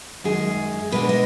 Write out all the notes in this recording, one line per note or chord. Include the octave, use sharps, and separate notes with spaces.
F#2 D#3 G#3 G#4
B2 G#3 B3 D4 B4
D#5